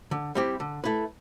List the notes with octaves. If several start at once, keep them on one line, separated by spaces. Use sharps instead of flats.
D3
G3 C4 E4 G4
D3
A3 E4 B4